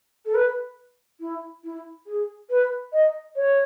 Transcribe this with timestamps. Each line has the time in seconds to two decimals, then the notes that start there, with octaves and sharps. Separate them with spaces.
0.25 A4
0.34 B4
1.20 E4
1.64 E4
2.06 G#4
2.50 B4
2.92 D#5
3.36 C#5